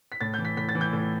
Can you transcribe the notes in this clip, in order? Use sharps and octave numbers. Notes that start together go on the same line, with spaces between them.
B6
A2 A6
G6
E3
B6
A2 B6
A6
E3
G6
A2